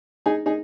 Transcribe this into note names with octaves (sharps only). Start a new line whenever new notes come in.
D#4 G#4
D#4 G#4